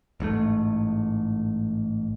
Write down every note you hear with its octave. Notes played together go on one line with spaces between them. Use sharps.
A1 G#2 B2 A3